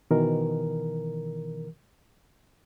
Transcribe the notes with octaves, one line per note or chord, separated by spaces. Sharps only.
B2 D#3 E3 A#4